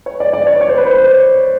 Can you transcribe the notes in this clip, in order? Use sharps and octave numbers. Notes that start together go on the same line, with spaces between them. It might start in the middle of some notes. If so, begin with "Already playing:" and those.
C#5
D5
D5
C#5
C#5
C5
B4
C5